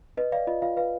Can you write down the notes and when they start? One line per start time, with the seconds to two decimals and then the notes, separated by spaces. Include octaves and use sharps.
0.17 B4 D#5
0.32 D5 F5
0.47 F4 D#5
0.62 F4 F5
0.77 B4 F5